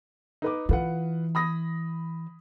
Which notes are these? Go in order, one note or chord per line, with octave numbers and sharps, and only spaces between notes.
D#4 B4 D6
E3 F4 B4 F#5
B5 D#6 A#6